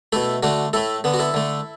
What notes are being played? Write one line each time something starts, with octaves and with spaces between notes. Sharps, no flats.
B2 A3 E4 A4
D3 A3 D4 F#4
A2 A3 E4 A4
D3 B3
F#4
E4 A4
D3 A3